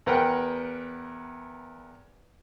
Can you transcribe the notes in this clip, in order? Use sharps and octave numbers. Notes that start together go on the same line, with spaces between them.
E2 A#4 B4 F#5 G5 F#6